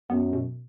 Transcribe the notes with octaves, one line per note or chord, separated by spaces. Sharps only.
F#2 B3
B2